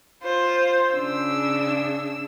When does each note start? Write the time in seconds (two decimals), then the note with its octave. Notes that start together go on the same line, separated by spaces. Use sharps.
0.23 F4 C5
0.93 C#3 D4 E6